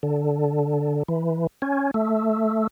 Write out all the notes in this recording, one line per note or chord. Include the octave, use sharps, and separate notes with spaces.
D3
E3
C#4
A3